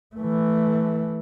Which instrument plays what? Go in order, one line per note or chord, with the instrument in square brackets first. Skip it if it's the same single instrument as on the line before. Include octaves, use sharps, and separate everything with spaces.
[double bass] E3 A3